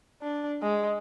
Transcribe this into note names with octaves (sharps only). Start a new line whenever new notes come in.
D4
G#3